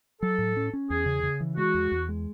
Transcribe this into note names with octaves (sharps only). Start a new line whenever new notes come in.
F#3 A4
A2
C#4
C#4
E2 G#4
C#3
C#3
E3
G#3 F#4
E2
E2
G#3